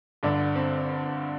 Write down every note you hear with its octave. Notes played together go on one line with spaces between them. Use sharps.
G1 G2 D3 D4
C4